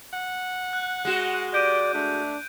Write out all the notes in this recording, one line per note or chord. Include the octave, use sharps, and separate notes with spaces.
F#5
F#6
G#3 F#4
G4 D5 G6 D7 D#7
A3 D4